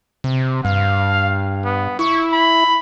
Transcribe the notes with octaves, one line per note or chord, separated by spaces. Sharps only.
C3
G2 F5
B3
E4 C#6
B5